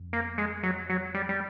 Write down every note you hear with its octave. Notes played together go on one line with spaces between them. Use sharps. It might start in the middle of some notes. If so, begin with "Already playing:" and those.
Already playing: F2
A#3
G#3
F#3
F#3
G3
G3